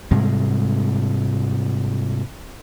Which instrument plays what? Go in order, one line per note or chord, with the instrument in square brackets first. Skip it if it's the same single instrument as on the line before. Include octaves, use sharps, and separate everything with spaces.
[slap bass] G#2 C3 G3 G#3